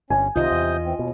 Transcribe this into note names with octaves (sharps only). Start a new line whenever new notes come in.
G1 C#4 G#5
C2 C3 D#3 F4 D#5 D#6 G6
E2
E3 C4
D#2 B2